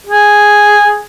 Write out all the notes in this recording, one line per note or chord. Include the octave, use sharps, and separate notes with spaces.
G#4